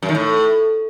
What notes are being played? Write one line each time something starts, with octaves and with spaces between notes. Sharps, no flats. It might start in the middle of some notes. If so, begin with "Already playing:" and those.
F#2
D#3
A2